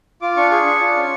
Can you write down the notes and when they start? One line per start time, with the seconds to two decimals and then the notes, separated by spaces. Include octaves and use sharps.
0.22 F4 D6
0.36 D4 C#6
0.51 G#4 C#6
0.66 D4
0.81 F4
0.96 C#4